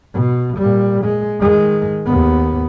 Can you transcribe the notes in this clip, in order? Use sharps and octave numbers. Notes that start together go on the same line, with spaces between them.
B2
A#2 G3
G#3
D#3 G#3
D#2 B3